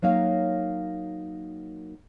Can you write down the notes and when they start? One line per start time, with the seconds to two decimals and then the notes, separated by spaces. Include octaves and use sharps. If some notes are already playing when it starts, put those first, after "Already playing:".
0.02 F#3 A#3 D#4 C#5 F5